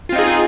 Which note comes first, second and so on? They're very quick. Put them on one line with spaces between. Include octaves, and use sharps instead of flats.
F4 C4 D#4 G#4